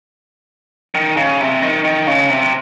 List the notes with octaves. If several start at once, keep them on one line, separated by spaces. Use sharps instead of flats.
D#3
C#3
C3
D#3
D#3
C#3
C3